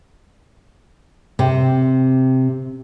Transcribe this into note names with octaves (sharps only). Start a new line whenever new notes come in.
C3 C4